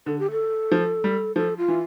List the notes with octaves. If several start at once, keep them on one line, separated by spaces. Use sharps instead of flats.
D3 A4
G4
A4
F3
G3
F3 A4
F4
E3